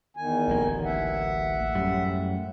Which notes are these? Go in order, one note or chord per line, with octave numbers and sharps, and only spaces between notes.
E2 D#3 G#5
D1 A1 A#3
E5 F#5
F#2 A2 G3